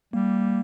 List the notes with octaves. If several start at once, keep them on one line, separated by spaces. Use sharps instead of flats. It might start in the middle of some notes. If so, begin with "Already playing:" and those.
G3 A#3